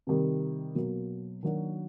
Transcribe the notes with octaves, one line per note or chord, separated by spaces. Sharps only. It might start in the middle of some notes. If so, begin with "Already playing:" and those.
C3 D#3 G3
B2 F#3 A#3
D#3 F#3 A#3 D4 F#4